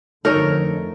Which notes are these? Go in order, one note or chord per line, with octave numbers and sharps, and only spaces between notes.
F2 D3 A3 D#4 A4 A#4 C#5